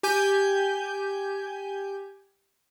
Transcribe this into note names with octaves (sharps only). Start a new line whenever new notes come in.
G4 G#5 G6